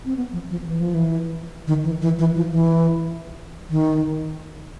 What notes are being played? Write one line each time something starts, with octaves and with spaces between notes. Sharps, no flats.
C4
B3
F3
F3
E3
F3
E3
D#3
E3
E3
E3
F3
E3
D#3